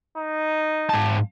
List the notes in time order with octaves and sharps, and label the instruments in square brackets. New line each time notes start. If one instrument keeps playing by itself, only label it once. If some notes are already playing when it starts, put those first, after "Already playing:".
[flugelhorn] D#4
[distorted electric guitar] G#2 A5